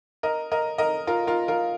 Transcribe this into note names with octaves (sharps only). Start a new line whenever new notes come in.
A#4 D#5
A#4 D#5
A#4 D#5
F4 A#4
F4 A#4
F4 A#4